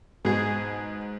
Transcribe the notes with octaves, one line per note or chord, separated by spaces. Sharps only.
G#2 B2 G#4